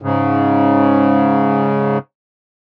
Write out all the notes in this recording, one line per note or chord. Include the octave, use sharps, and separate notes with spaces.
G#2 C#3